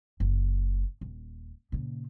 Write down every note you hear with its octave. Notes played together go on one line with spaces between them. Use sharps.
F#1
D#1
A#2 C#3